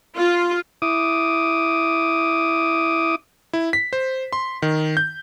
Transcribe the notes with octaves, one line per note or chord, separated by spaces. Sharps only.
F4
E4 D6 D#6
E4
B6
C5
C6
D#3
G6